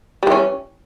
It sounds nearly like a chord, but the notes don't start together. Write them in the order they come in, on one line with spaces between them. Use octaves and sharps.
G3 E3 C#4